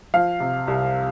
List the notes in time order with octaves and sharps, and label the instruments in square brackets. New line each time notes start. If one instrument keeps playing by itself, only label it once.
[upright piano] F3 F5
C3
C2